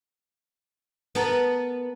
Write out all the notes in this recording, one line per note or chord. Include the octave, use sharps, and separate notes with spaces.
B3 A4 A#4